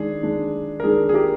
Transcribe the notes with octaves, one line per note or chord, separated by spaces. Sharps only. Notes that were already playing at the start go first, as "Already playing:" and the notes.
Already playing: D#3 G#3 D4 G#4
D#3 G#3 D4
A#4
D#3 G#3 D4 G#4
G#4
G4 A#4